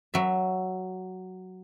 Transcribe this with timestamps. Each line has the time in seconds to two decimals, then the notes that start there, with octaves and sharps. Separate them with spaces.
0.14 F#3 E5